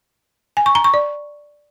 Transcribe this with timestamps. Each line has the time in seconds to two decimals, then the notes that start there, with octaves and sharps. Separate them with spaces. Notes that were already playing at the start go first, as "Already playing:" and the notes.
0.57 G#5
0.66 C#6
0.75 A#5
0.84 C#6
0.94 D5